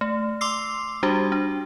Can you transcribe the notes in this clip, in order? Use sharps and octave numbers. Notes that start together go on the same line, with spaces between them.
A3
C6 D6 E6 C7
G3 D4 F#4 G4
D4